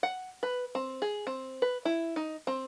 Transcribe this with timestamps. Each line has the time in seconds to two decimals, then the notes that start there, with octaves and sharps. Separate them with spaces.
0.03 F#5
0.43 B4
0.75 C4
1.02 G#4
1.27 C4
1.62 B4
1.85 E4
2.16 D#4
2.47 C4